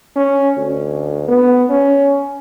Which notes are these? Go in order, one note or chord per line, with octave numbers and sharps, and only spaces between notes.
C#4
D2
B3
C#4